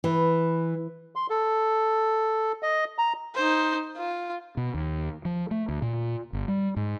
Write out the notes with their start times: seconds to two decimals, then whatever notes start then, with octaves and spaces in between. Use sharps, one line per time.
0.04 E3
1.16 C6
1.30 A4
2.63 D#5
2.98 A#5
3.35 D#4 C5
3.96 F4
4.57 B2
4.74 D#2
5.25 F3
5.51 A3
5.69 D2
5.82 A#2
6.33 G1
6.48 G3
6.76 G#2